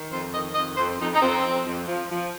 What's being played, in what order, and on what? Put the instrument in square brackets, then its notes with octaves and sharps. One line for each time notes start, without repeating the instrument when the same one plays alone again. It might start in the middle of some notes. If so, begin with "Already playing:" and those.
Already playing: [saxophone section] D#3
F2 C5
D#3 D#5
F2 D#5
F2 C5
F2 D#4
D#4
F2 C4
F2
F2
F3
F3